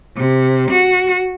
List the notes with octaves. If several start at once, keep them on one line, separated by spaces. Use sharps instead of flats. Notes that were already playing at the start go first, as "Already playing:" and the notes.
C3
F#4